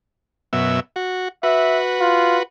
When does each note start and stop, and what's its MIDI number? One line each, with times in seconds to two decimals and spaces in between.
0.53 0.80 42
0.53 0.80 47
0.53 0.80 76
0.96 1.28 66
1.43 2.43 66
1.43 2.43 71
1.43 1.80 76
2.00 2.39 65